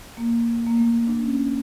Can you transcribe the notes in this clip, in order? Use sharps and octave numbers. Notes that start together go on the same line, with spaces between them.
A#3
A#3
A3
D4
C#4